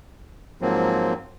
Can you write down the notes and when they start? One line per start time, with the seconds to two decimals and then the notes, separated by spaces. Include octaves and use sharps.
0.61 G#2 F3 F#3 A#3 C4